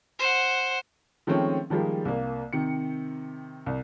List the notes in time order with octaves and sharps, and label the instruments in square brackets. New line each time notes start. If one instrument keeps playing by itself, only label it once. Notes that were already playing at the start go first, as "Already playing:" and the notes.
[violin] C5 F#5
[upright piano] D#3 F3 G#3 A3 C4 C#4
D#3 F3 G3 G#3 A#3
C2 A#3
C3 D#3 C#7
C2